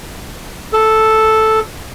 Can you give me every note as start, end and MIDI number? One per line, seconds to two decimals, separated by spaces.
0.73 1.60 69